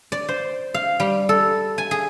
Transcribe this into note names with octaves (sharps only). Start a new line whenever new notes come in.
D5
C5
F5
G3
A4
G#5
G#4